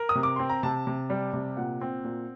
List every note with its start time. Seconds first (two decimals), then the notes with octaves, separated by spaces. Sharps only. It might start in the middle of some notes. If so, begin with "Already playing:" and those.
Already playing: A#4
0.09 D#6
0.15 C3
0.23 D6
0.36 C4 C6
0.49 A#5
0.63 C3 A5
0.87 C3
1.10 G3
1.33 C3
1.57 A#2 F#5
1.81 C4
2.04 A#2